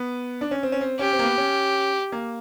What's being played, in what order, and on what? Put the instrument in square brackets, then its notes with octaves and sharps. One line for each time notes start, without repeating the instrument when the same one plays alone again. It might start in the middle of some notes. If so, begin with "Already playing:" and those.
Already playing: [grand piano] B3
D4
C#4
C4
C#4
C4
[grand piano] C#4 [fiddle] G4
[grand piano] C4
A#3
B3
C#4
A#3